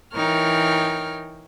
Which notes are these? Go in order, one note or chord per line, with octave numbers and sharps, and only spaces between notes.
E3 D#4 A#4 C#5 G5 F6